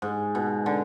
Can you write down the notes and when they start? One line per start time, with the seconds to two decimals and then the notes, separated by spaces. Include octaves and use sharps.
0.02 G#2
0.35 B2
0.66 D3